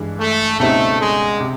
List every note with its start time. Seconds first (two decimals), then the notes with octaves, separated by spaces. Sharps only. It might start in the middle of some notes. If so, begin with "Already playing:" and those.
Already playing: G2 E3 G#3
0.19 A3
0.59 C#2 B2 G3 A3 C4 D#4
1.00 G#3
1.40 C3